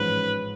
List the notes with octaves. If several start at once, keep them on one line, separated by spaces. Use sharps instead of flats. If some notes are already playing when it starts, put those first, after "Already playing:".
Already playing: A1 G#2 F3 G#3 C#4 B4